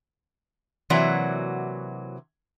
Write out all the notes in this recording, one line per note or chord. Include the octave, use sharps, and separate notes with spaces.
C3 E3 F#3 A#3 F#4 D5